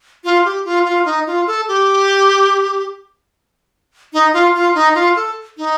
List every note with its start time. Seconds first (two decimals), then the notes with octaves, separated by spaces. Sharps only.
0.24 F4
0.45 G4
0.65 F4
0.85 F4
1.05 D#4
1.27 F4
1.47 A4
1.68 G4
4.13 D#4
4.33 F4
4.54 F4
4.75 D#4
4.95 F4
5.16 A4
5.58 D#4